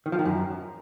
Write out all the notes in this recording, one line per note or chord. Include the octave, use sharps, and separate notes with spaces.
D#3
F3
D#3
F#2